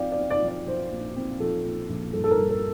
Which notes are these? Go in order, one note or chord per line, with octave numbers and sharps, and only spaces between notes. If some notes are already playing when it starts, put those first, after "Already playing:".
Already playing: F3 C4 D5 F5 G5
D5
C4
D5
F3
D5
F3 C5
A#1
C4
F3 A4
A#2
A#1
G2 A4
A4
A#4
G2
A#4